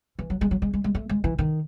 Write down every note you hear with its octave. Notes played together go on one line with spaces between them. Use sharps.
E3
F#3
G#3
F#3
G#3
G#3
G#3
A3
G#3
E3
D#3